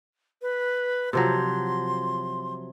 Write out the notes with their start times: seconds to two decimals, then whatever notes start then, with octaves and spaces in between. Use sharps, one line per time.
0.42 B4
1.13 C3 F3 F#3 C6